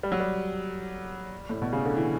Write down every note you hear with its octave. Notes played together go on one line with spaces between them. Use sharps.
G3
F#3
G3
A2
B2
C#3
D3
E3